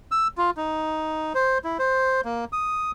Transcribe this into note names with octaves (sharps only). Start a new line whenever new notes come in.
E6
F4
D#4
C5
E4
C5
A#3
D#6